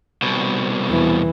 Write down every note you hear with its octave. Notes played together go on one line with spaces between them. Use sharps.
C2 B2
E2 E3